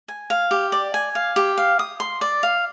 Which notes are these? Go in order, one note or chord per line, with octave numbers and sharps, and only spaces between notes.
G#5
F5
G4
D5
G#5
F5
G4
F5
D#6
C6
D5
F5